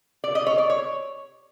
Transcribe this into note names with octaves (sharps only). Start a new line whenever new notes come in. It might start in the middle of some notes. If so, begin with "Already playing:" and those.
D5
D#5
C#5
D5
C#5